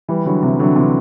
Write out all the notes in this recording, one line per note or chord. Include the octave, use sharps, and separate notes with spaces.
E3 G3
D3 F#3
C3 E3
D3 F#3
C3 E3